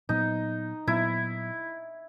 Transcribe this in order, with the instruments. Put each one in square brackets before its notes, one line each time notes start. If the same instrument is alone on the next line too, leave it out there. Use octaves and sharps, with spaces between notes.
[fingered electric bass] A#2 F#3 B3 [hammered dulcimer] D#4
[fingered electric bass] A#2 F#3 B3 [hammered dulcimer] E4